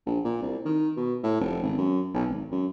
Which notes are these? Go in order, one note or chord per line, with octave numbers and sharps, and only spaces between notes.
A#1
A#2
C2
D#3
B2
A2
F1
G#1
F#2
B1
G#1
F#2